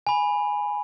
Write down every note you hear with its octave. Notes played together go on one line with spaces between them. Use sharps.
G#5 B5